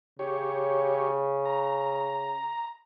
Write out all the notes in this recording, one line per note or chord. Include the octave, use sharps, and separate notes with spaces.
C#3 G4 C#5
A#5